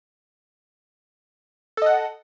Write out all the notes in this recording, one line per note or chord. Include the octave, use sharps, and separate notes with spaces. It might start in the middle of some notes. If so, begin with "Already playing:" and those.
A4 D#5 F#5